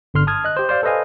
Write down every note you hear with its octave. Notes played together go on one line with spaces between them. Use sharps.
G1 D3 C6 F6
A5 D#6 F6 G#6
D#5 F#6
G4 C5
C5 D5 F5
A4 B4 C5 D#5 F5 G#5